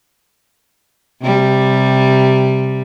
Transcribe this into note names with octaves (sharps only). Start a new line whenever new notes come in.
C3 G3